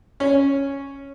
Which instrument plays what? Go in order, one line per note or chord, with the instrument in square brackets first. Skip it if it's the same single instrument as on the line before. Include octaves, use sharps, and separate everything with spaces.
[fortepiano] C#4